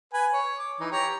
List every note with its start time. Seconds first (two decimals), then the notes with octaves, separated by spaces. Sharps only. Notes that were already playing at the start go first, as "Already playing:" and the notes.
0.13 B4 G#5
0.33 C#5
0.58 D6
0.80 E3 D#4
0.92 G4 C#5 A#5